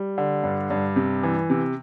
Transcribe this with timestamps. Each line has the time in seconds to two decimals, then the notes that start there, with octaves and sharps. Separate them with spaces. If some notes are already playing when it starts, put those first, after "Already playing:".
Already playing: G3
0.18 D3
0.44 G2
0.70 G2
0.96 C3
1.23 E3
1.50 C3